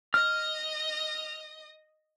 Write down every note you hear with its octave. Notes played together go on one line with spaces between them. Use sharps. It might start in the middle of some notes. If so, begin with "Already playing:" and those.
D#5 D#6 F6